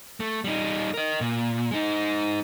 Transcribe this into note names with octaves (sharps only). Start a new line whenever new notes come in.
A3
G3 D#4
A#4 D#5
A#2
G#3 D#4